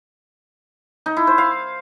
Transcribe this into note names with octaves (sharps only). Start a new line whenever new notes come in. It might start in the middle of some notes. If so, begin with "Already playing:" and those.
D#4
E4
C5
F5